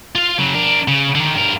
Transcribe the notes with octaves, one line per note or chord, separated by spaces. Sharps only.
F4 F5
C#3 F#3
D4 A#4
C#3
D3 D#3
G2 A#4